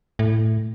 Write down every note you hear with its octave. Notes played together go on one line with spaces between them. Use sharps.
A2